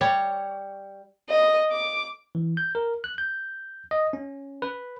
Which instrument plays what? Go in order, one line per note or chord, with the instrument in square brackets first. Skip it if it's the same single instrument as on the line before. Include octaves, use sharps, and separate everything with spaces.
[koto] G3 C#5
[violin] D#5
D6
[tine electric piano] E3
G6
A#4
F#6
G6
D#5
C#4
B4